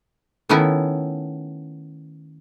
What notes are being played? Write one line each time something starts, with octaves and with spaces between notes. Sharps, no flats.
D#3 A3 B3 C#4 E4